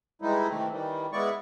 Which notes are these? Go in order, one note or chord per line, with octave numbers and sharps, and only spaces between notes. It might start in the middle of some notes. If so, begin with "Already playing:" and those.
E3 G3 G#3 D#4 E4
C3 D#3 E3 A3 C4
D#3 E3 G3
G#3 B3 E4 D5 C#6